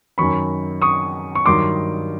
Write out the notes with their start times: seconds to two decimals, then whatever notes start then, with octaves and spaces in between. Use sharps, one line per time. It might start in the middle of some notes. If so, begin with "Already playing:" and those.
0.18 F#2 D#3 F#3 B5 C#6
0.82 C#6 D#6
1.35 C#6
1.46 G2 D#3 F#3 C6 D6